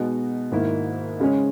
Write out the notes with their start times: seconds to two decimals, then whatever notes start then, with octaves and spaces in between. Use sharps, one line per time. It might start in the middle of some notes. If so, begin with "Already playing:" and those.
Already playing: B2 G#3 B3 D#4 F#4
0.51 G#2 D#3 A#3 E4
1.20 C#3 G#3 C#4